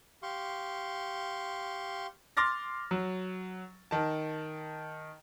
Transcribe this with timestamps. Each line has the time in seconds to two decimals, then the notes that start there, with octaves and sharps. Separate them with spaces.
0.23 G4 F5 C6 C#6
2.37 C6 D6 F6 A6 A#6
2.91 F#3
3.91 D#3 A5